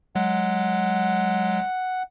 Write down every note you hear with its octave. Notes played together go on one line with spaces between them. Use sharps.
F#3 G#3 F#5